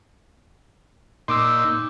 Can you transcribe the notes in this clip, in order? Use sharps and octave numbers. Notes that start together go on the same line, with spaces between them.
A#2 D#4 C6 D6 E6